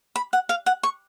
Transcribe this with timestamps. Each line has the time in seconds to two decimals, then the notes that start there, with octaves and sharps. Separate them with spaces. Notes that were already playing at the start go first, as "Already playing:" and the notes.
0.16 B5
0.33 F#5
0.49 F5
0.66 F#5
0.83 C#6